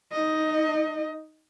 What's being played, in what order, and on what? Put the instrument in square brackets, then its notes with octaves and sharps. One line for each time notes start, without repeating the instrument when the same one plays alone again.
[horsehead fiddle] D#4 D#5